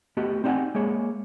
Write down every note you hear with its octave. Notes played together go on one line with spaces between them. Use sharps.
A3 B3 F#4 G4 D#5
C4 D#4 D5 E5 F#5 G#5
G#3 A#3 G#4 C#5